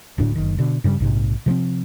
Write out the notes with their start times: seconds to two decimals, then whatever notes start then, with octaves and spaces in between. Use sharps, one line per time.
0.18 D1 D2 A2 D4
0.36 F#1 D#3
0.59 B2 D3
0.84 G2 C#3 E3 G3
1.00 A#1 G#2 C3
1.46 C3 F3 A3 C4